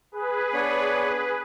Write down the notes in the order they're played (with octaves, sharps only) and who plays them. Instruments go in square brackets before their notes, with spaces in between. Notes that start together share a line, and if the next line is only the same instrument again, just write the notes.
[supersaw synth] G#4 B4
[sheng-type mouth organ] B3 D4 C#5